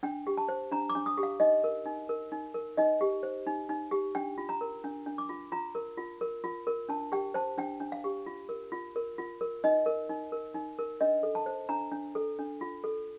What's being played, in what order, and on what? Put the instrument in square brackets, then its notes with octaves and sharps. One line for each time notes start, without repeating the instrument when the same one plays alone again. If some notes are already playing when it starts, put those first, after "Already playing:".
[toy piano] D4 G5
G4
A5
C5
D4 A#5
D6
D4
D#6
G4
F5
D#4 D#5
A#4
D#4
A#4
D#4
A#4
D#4 D#5
G4
C5
D#4
D#4
G4
D4 G5
F4
A#5
A#4
D4
D4
D6
F4
F4 A#5
A#4
F4
A#4
F4
A#4
D4 A5
G4 G5
C5 A5
D4 G5
D4
F5
G4
F4
A#4
F4
A#4
F4
A#4
D#4 D#5
A#4
D#4
A#4
D#4
A#4
D4 D#5
A4
A5
C5
D4 A#5
D4
A4
D4
F4
A4